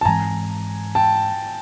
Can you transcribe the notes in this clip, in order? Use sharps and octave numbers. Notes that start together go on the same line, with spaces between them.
A5
G#2 E3 G#3 C4 G#5 A#5
G5 A5